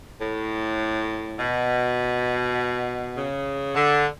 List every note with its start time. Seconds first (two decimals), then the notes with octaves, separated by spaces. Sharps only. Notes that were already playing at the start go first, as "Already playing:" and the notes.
0.21 A2
1.40 B2
3.17 C#3
3.76 D3